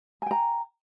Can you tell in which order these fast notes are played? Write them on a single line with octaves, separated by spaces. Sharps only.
G#5 G5 A#5